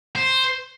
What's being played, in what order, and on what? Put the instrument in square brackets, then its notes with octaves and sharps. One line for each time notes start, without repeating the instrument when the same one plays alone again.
[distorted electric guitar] C5